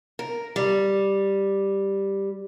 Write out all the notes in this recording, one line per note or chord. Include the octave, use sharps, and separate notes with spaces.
A#4
G3